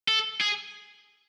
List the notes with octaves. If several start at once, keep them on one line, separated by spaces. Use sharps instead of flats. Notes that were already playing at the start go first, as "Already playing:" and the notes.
A4
G#4